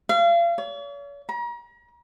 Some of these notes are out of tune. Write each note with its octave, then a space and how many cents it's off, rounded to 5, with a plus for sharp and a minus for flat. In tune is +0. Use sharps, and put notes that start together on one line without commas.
F5 -35
C#5 +45
A#5 +40